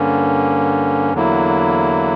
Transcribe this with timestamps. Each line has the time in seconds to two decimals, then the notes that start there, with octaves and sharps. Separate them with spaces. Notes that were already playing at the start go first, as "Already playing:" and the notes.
Already playing: G2 D3 A#3 C#4
1.14 E2 D3 F#3 A#3 E4